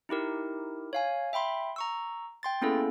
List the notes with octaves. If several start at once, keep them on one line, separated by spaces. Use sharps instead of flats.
D#4 E4 G4 A#4
C#5 F5 G#5
E5 G5 B5 C6
A#5 C#6 E6
G5 C6 A6
A#3 B3 C#4 E4 G#4 A4